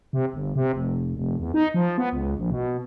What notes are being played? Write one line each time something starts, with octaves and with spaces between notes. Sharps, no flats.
C3
G1
C3
F1
F1
E2
D#4
F3
B3
C#2
A#1
B2